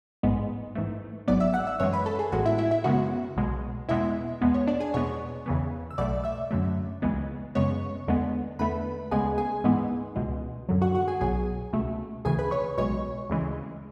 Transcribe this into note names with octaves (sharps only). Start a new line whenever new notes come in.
A1 G#2 G#3 B3
G#2 E3 A3
G#1 G#2 F#3 B3 D5 D6
E5 E6
F#5 F#6
E5 E6
F#2 E3 G#3 C#5 C#6
B4 B5
A4 A5
G#4 G#5
A1 A2 G#3 B3 F#4 F#5
E4 E5
E4 E5
E4 E5
F#2 C#3 G#3 B3 F#4 F#5
B1 B2 G#3
E2 B2 G#3 B3 E4 E5
E2 B2 G#3 B3
C#5
D4 D5
G#4 G#5
E2 B2 G#3 B3 C#5 C#6
E2 C#3 E3 B3
E6
B1 B2 A3 D5 D6
E5 E6
F#2 D3 F#3 A3
C#2 C#3 E3 G#3 B3
F#2 C#3 G#3 B3 C#5 C#6
E2 D3 G#3 B3
E2 D3 A3 B4 B5
D2 C#3 G#3 B3 G#4 G#5
G#4 G#5
G#2 E3 G#3 B3
C#2 B2 G#3
F#2 D3 F#3
F#4 F#5
F#4 F#5
G#4 G#5
B1 B2 F#3 G#4 G#5
C#2 B2 A3
D2 C#3 E3 G#4 G#5
B4 B5
C#5 C#6
B1 B2 G#3 C#5 C#6
D2 C#3 E3 G#3